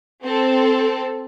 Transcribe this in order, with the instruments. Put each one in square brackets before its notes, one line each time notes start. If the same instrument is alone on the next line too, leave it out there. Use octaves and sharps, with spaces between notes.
[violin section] C4 A4